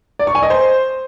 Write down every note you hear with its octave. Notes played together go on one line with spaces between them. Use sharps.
D5
C#6
G#5
D#5
C5